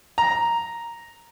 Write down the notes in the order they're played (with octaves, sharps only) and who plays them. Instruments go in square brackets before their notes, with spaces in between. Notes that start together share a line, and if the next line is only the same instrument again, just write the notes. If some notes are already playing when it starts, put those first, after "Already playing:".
[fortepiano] A#5